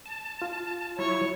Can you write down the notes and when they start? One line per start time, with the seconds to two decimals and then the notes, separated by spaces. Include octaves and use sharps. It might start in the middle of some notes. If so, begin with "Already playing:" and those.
0.06 A5
0.42 F4
0.99 F#3 E4 C#5